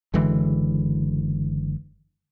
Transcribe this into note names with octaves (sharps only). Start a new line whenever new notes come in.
F#1 D3 E3 G#3